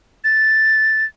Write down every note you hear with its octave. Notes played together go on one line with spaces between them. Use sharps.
A6